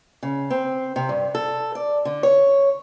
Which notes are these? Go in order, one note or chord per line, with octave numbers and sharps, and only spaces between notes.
C#3
C4
C3
G2
A4
D5
D3
C#5